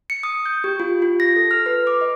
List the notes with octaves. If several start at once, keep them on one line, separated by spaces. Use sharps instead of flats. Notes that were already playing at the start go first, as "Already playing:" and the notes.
C#7
D#6
G6
G4
F4
F4
A#6
A4
F6
B4
D6
D#5